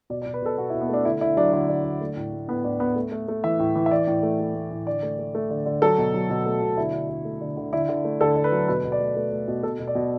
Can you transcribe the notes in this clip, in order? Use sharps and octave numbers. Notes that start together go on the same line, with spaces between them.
B2 D5
D5
B2
B4
B2 A4
B2 F#4
E4
B2
B3
A3 D4
D3 E4
D3 E4
F#3 D4
D3
D3
D3
A3
A2
A3
A2 B3
A2 D4
A2 B3
A3
A3
A3
E3 E5
A2
E3
E5
E3 D5
A2
A3
A3
A3
A2
D3 D5
A3
A3
A3
D3
D3
F#3 A4
B2
F#3
B2
A3
B2
D3 E4
D3
D3
A3
D3
D3
D3 E4
D3
A3
D3 A4
D3
B4
F#3
B2 B4
B2
D5
A3
A3 B4
A3
B2
B2 A4
B2
D5
B2